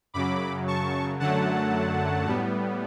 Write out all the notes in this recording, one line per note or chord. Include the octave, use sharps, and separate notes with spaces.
F#2 C#3 F#3 B5 D6
A5 C#6
F#2 D3 F#3 A3 F#5 A5
A2 G3 B3